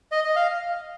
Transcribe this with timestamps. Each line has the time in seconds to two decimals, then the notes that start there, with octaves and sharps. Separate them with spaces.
0.12 D#5
0.24 D#5
0.36 F5